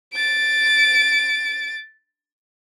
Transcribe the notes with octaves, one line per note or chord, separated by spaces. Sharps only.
A6 D7